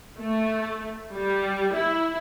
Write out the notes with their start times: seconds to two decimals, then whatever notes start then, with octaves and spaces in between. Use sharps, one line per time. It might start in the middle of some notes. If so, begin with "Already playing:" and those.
0.18 A3
1.14 G3
1.74 E4